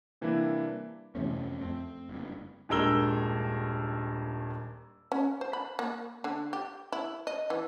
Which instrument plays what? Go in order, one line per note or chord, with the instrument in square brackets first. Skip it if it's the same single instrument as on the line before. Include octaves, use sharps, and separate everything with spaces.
[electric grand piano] C3 E3 G3 A#3 D4 E4
[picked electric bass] F2 C4 C#4 [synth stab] C3 E3 A3
[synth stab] F2 A3 [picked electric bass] C4
[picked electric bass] F#1 G2
[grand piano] D#1 G2 G#3 A#4 E6 G7
[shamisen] C#4
C5
B5
A#3
D3
G4
E4
D#5
E3